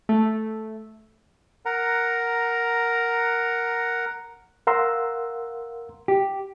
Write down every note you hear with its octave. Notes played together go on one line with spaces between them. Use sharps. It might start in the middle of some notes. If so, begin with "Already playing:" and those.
A3
A#4 F#5 A#5
A#4 F5 F#5 A#5 C6 E6
G4